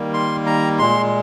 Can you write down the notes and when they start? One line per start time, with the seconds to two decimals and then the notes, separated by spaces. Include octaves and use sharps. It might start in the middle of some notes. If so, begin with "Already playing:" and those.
Already playing: D#3 G3 A#3
0.14 C6
0.46 A#5
0.79 A#2 G#3 C6